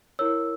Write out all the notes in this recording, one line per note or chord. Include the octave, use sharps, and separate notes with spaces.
E4 A#4 C#5 E6